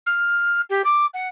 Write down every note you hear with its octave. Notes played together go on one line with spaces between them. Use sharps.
F6
G4
D6
F#5